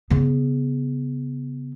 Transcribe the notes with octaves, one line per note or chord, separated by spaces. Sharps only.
C#3 B3